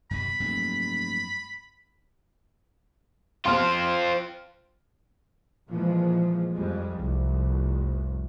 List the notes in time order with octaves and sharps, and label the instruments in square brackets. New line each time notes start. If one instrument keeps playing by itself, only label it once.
[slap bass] F#2 B2 G3 [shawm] B5
[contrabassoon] F1 [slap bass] G2 F#3 A#3
[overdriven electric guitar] C4 F4 [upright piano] C6 F6
[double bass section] A#2 E3 F3 G#3
F2 G3 G#3
F1 C2